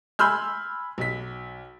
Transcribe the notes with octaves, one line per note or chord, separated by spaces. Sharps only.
G#5 B5 C6 E6 F6 G6
B1 B6